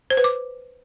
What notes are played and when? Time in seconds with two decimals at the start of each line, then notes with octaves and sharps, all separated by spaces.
0.10 C5
0.17 B4
0.24 D6